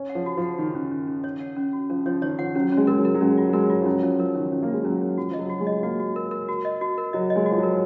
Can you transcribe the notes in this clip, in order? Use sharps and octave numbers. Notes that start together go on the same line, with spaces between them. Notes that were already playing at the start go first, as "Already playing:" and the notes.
Already playing: C#4
F#5
F3
F#4
F3 F#5
D#3 F#4
D#3 C#4
C#4
C#4
C#5
F#5
C#4
F#4
F3 C#4
F3 C#5
D#3 C#5
F3 F#5
F#3 C#4
G#3 C#4
G#3 A#4
F#3
A#4
F#3
G#3 C#4
F4
F#3
G#3 A#4
F4
F3
F#3 C#4
F3 C#4
F3 A#4
D#3 C#4
F3 C#4
A#3
F4
G#3
F#3 C#4
C#4
F3 F#4
F3 D#5
F#3
F#4
G#3
D#5
A#3 F#4
F#4
A#4
A#4
F#4
D#5
F#4
A#4
F#3 D#5
D#5
G#3
F#4
F3
F#3
A#4